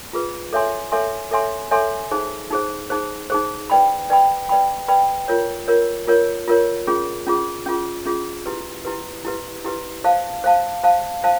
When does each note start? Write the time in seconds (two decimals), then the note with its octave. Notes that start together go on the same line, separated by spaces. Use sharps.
0.13 F4 G#4 B4
0.53 A4 C#5 E5 G#5 C6
0.92 A4 C#5 E5 G#5 C6
1.31 A4 C#5 E5 G#5 C6
1.71 A4 C#5 E5 G#5 C6
2.12 D#4 G#4 C5
2.51 D#4 G#4 C5
2.90 D#4 G#4 C5
3.30 D#4 G#4 C5
3.70 B4 D5 G5 B5
4.10 B4 D5 G5 B5
4.49 B4 D5 G5 B5
4.88 B4 D5 G5 B5
5.28 F4 A#4 C#5
5.68 F4 A#4 C#5
6.08 F4 A#4 C#5
6.48 F4 A#4 C#5
6.87 C#4 F4 G#4
7.27 C#4 F4 G#4
7.66 C#4 F4 G#4
8.06 C#4 F4 G#4
8.46 E4 G4 B4
8.85 E4 G4 B4
9.25 E4 G4 B4
9.65 E4 G4 B4
10.04 C5 F5 A5
10.44 C5 F5 A5
10.84 C5 F5 A5
11.24 C5 F5 A5